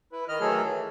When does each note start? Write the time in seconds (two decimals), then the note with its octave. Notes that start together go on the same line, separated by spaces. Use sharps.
0.12 E4 B4
0.28 D#3 D#5 F6
0.40 D#3 E3 F#3 A3 G#4 A4
0.66 E3